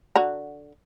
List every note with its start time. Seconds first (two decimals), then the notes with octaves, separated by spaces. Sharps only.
0.16 D3 F#4 A#5